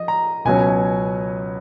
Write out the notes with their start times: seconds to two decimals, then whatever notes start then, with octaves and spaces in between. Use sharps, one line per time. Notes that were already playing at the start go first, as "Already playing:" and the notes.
Already playing: F3 D#5
0.08 A#5
0.45 C#2 B2 F#3 C#4 G#5